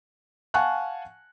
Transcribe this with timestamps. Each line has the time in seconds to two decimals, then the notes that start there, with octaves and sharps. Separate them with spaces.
0.54 F5 F#5 G#5 A5 C#6 F#6